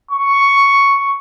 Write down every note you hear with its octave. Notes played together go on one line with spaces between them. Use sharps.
C#6